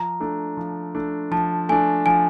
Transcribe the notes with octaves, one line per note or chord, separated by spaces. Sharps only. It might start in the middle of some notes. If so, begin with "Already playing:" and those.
Already playing: F3 A#5
A3 D4
F3
A3 D4
F3 A5
A3 D4 G#5
F3 G#5